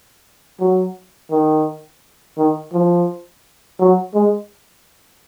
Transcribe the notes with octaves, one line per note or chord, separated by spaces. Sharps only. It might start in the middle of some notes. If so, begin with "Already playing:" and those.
F#3
D#3
D#3
F3
F#3
G#3